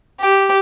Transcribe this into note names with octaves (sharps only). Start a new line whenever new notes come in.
G4